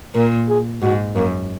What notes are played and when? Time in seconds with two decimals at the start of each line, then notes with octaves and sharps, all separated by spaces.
0.15 A#2 A#4
0.48 G#4
0.82 G#2 F#4
1.15 F#2 A#3